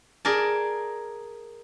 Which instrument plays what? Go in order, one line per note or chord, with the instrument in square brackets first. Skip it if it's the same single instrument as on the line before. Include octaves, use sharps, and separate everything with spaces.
[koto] G#4 A#4 D5 A5